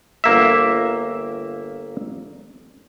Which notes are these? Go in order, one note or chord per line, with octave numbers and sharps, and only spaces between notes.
G1 A#3 E5